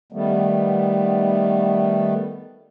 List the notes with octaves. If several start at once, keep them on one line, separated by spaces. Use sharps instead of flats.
D#3 G3 A3 B3